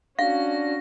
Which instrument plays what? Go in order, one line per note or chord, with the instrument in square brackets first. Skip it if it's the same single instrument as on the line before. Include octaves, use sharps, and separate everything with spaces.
[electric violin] C#4 F#4 [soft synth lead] D4 [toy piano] F5 [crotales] A#6